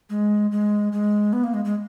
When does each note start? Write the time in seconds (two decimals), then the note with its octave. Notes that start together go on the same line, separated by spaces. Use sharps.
0.10 G#3
0.52 G#3
0.92 G#3
1.33 B3
1.44 A#3
1.54 G#3
1.65 G#3